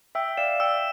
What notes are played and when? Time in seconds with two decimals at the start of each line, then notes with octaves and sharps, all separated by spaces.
0.15 E5 G5 E6
0.37 D5 F5 E7
0.60 E5 G5 E6